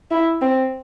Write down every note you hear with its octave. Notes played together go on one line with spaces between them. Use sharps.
E4
C4